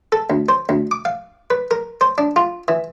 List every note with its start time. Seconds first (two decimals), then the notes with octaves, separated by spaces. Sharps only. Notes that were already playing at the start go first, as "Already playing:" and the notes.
0.12 A4
0.30 D2
0.49 C5
0.69 D2
0.91 D6
1.05 F5
1.50 B4
1.71 A#4
2.01 C5
2.18 D4
2.36 F4
2.68 E3